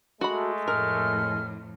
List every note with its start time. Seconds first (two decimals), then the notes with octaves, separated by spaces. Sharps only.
0.21 G#3 A3 F#4 B5
0.68 F2 A2 A#4 F6